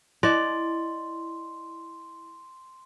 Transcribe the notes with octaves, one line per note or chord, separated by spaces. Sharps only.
E4 D5 D#5 C6